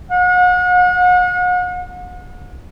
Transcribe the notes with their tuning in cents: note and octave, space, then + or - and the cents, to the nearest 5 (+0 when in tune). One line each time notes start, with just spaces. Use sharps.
F#5 -40